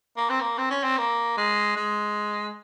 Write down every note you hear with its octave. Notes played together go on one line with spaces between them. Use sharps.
A#3
C4
A#3
C4
C#4
C4
A#3
G#3
G#3